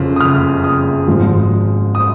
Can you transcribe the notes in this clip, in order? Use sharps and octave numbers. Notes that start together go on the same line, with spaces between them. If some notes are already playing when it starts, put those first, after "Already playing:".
Already playing: F#1 F2 C#3
D#6
F6
D#6
G#1 G#2 F3
D#6